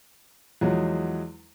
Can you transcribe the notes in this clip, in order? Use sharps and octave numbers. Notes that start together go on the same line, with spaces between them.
E2 F3 F#3 G#3